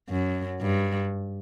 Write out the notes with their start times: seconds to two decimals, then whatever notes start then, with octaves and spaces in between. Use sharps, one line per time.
0.09 F#2
0.60 G2